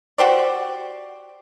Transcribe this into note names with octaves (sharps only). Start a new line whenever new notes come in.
F#4 G4 C5 D5